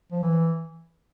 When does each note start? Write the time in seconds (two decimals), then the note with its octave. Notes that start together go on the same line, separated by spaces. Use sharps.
0.12 F3
0.22 E3